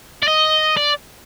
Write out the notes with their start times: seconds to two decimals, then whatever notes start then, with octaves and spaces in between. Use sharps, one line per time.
0.23 D5
0.28 D#5
0.77 D5